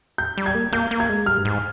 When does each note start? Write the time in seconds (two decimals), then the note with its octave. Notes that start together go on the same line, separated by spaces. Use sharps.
0.18 G6
0.38 G3
0.46 G#6
0.55 A#3
0.72 A#3 G6
0.91 A#3
1.00 G#6
1.09 G#3
1.26 G3 F6
1.38 G2
1.45 G#2